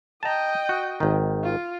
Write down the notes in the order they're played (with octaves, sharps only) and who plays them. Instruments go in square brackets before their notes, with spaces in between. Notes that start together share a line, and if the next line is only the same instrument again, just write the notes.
[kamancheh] D#5 G5 [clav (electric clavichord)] A5 A#5
[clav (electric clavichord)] F#4
G#1 D#3
[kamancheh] F4